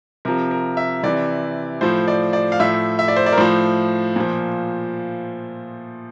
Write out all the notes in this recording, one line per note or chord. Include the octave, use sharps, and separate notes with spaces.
C3 F3 A#4
A#4
E5
C3 E3 D5
A2 F3 C5
D5
D5
F5
A2 F3 E5
E5
D5
C5
D5
A#4
A2 F3 C5
A#2 F3